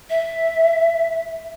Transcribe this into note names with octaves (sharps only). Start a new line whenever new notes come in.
E5